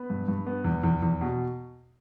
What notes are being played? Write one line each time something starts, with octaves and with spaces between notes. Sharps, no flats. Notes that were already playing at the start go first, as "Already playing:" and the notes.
Already playing: B3 B5
G2
G2
B3
E2
E2
E2
B2